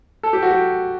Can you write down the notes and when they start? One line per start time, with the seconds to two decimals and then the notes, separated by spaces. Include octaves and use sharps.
0.23 A4
0.33 G4
0.42 F#4
0.51 G4